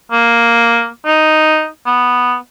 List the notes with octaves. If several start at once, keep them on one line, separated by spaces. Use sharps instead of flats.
A#3
D#4
B3